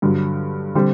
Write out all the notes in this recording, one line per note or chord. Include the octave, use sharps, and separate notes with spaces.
G2 D3 F#3
D3 G3 C4